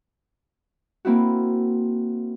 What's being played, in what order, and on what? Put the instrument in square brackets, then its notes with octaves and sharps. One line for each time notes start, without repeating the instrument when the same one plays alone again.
[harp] A#3 C4 E4 F#4